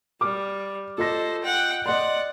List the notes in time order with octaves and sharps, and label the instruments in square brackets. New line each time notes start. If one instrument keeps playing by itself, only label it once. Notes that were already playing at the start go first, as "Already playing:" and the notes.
[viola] G3 [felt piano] D6 F6
[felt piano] F4 D#5 A#6 [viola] A4 C5
[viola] F#5 G5
[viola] D5 F#5 [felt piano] D#5 C6